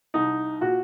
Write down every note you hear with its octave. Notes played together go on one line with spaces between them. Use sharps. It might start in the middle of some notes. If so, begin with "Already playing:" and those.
C2 D#4
A#2 F#4